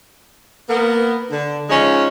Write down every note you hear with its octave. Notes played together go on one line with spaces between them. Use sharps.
A#3 B3
D3
F3 G#3 C#4 D#4